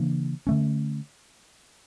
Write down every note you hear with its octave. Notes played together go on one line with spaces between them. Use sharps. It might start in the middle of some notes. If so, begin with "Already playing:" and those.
Already playing: C#3 E3 A#3 D4
D3 A3 C#4